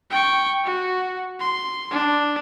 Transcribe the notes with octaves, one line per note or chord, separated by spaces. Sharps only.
G5 C#6
F#4
C6
D4